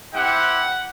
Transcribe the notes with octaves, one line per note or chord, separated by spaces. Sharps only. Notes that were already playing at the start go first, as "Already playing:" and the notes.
C4 E4 G4 F#5